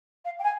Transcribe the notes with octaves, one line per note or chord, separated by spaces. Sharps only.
F5
G5
G#5